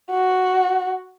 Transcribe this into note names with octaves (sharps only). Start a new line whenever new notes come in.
F#4